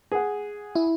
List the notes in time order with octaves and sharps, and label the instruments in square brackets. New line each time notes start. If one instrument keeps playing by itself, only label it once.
[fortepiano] G#4 F#5
[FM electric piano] E4